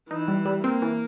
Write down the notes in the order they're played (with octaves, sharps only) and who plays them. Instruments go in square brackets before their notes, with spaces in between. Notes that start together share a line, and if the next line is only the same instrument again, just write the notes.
[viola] E3 [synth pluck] D#4
[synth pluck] G3
G3
[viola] A#3 [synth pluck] C4
[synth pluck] E3